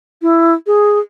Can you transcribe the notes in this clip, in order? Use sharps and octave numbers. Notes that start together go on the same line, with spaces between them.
E4
G#4